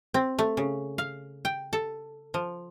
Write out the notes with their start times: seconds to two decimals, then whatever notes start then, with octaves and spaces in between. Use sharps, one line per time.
0.14 C4
0.39 A3
0.57 C#3
0.98 F5
1.45 G5
1.73 A4
2.34 F3